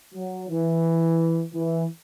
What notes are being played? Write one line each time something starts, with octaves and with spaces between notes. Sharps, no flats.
F#3
E3
E3